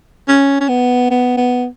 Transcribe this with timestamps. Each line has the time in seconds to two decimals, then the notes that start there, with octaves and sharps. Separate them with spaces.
0.28 C#4
0.60 C#4
0.69 B3
1.11 B3
1.37 B3